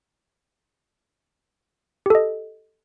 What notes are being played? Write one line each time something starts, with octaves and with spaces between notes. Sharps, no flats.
G4 A4 D#5